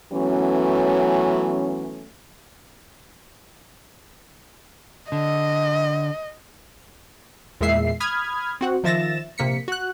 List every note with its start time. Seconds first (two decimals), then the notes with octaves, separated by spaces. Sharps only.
0.12 E3 F#3 A3 B3 C#4
5.12 D3 D#5
7.61 E2 A#2 G#3 E5 C7
8.00 B5 D#6 F6 G#6
8.61 C4 F#4 F#5
8.84 D#3 F3 E5 A6 A#6 E7
9.38 A#1 C3 A#3 B6 C#7
9.68 F#4 F#6